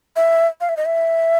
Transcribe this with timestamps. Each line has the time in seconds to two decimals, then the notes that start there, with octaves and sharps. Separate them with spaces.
0.16 E5
0.61 F5
0.69 E5
0.77 D#5
0.85 E5